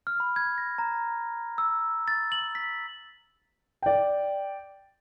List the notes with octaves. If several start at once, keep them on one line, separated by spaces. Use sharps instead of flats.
F6
B5
G#6
A#6
A#5
E6
A6
F#7
B6
D5 G5